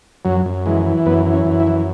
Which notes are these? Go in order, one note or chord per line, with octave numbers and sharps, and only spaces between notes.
F#2 F#3
F#2
E3 G#3
E3
F#2 B3
E3
C#4
F#2
E4
E3